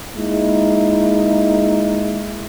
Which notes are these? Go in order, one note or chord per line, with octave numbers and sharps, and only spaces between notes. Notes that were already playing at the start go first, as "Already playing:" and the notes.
G#3 A#3 D#4 E4